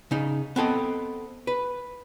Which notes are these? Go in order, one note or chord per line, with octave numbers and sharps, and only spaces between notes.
C#3 D#4
B3 C4 A4 D#5
B4